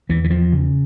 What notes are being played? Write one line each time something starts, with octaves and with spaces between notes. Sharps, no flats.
E2 E3
E3
F3
C#3